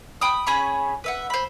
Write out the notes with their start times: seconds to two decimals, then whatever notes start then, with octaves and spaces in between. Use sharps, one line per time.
0.21 G5 B5 D#6
0.47 C#4 G#4 B5 C#6
1.04 B4 E5 F#5
1.30 C5 B5